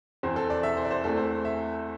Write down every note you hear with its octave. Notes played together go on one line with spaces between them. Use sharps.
E2 E3 C4 C5
A4
D5
E5
C5
D5
C5
E2 E3 A3 C4 A4
C5
E5